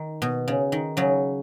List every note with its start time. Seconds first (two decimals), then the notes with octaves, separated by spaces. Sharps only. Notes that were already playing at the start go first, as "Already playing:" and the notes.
Already playing: D#3
0.22 B2
0.48 C#3
0.72 D#3
0.97 C#3 F#3